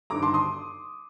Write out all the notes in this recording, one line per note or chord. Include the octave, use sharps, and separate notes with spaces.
G1 G2 D#3 A#5 D6
A5 C6
C6 D#6